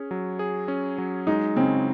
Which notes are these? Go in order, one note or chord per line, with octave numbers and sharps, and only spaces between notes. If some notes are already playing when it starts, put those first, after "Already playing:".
Already playing: C#4 G#4
F#3
G#4
C#4
F#3
G#3 D#4
C#3 C4